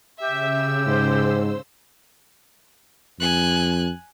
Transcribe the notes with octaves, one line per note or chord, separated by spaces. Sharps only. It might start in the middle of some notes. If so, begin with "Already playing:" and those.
C#3 G4 E5 E6
G#2 C5
F2 G#5 F#6